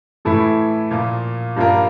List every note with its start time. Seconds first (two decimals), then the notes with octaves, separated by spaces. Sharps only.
0.25 A2 E3 A3 E4 A4
0.91 A#2 F3 A#3
1.56 G2 F3 A#3 F4 A#4